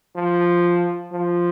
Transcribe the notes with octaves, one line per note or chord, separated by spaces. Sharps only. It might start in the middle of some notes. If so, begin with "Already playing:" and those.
F3
F3